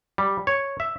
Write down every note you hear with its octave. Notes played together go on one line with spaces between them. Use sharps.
G3
C#5
E5